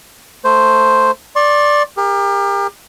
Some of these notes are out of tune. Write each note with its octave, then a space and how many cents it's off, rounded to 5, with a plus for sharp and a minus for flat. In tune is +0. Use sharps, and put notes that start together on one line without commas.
A3 +10 C5 +0
D5 +0 C6 +45
G4 +35 A#4 +0